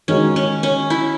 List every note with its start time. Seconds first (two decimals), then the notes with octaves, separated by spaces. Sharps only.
0.08 D#3 G#3 C#4 D#4 F#4
0.36 C#4
0.63 C#4
0.90 E4